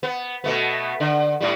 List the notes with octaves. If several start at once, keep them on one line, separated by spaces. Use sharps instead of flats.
B3
B2 A3 B3
D3
A2 G3